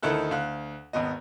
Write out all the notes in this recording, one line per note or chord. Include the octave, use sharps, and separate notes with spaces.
D2 D#3 D#4 E4 A4 F#6
D2 F5 F#6
G#1 D#2 B3 D#5